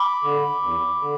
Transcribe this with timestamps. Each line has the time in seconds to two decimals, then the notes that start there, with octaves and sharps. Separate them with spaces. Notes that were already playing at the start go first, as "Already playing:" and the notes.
Already playing: B5 D6
0.24 D3
0.63 E2
1.01 D3